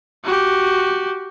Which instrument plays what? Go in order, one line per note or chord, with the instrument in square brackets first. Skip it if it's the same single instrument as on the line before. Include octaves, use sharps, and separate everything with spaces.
[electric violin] F#4 G4